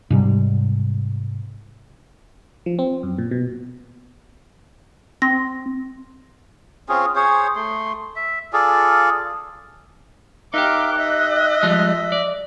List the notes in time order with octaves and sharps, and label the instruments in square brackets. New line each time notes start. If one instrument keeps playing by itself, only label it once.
[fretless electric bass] G#2 C3 G3
[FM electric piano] F3
C4
F#2
A#2
B2
[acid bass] C4 [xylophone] C6 A#6
[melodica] C4 C#4 F4 G#4
G#4 C5 C#5
A3 C6
E5
F4 G#4 A4 D5
[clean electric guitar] D#4 G4 [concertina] A#4 E5 F5 [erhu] D6 [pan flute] F#6
[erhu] D#5 [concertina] E5
[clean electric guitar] F3 G3 G#3
D5